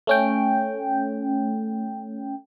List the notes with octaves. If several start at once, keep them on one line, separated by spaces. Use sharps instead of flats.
A3 C#4 G5